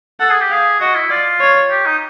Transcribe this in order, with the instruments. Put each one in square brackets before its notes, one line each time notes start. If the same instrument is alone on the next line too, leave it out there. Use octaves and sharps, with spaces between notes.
[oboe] A4 [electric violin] F#5
[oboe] G#4
G4
[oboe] G#4 [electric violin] F5
[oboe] F#4 [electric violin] D#5
[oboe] E4
[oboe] F4 [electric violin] D5
[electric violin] C#5
[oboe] G4
D#4